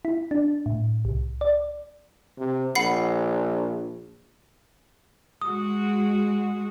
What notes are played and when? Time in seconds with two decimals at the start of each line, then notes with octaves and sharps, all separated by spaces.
0.05 E4
0.31 D4
0.66 A2
1.05 C2
1.41 D5
2.38 C3
2.75 A#1 F#5 B5 C7
5.42 G#3 F#4 D#6